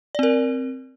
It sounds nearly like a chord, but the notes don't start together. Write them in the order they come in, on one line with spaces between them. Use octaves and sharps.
D5 C4 A#4